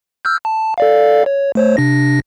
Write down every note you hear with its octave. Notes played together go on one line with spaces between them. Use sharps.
E6 F6 G6
A5
A4 D5 F5
C#5
A3 C5 C#5
C3 D4 A#6